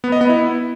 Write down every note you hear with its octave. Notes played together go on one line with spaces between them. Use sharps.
B3
D#5
B3
E4